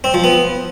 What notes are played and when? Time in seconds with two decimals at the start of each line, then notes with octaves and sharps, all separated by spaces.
0.04 C4
0.14 F3
0.24 B3